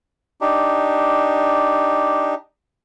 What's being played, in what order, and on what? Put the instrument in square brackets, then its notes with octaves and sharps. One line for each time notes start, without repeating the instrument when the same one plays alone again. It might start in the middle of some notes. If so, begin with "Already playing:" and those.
[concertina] D4 D#4 G4